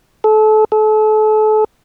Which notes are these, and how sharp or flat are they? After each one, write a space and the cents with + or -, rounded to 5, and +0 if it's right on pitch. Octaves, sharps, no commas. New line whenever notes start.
A4 -30
A4 -35